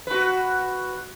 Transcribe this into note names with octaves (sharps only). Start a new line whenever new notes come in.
F#4 B4